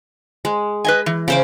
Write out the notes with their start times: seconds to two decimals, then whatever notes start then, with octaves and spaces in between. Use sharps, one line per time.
0.45 G#3
0.85 B4 D#5 G#5
1.06 E3
1.28 C#3 C5 D6